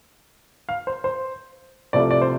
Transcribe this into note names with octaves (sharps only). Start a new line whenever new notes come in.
F5
C5
C5
C2 C3 F3 A3 D5
D5
C5